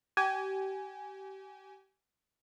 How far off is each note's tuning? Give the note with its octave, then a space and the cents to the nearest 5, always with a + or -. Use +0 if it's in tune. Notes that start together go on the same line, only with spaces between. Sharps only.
G4 -30 G#5 +0